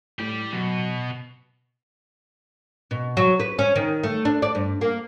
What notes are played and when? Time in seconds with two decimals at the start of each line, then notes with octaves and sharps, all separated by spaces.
0.19 A2 G4 D5
0.52 B2 F#3
2.91 B2
3.17 F#3
3.40 B4
3.59 C#4
3.76 D#3
4.03 A3
4.25 D4
4.42 D5
4.55 G2
4.81 A#3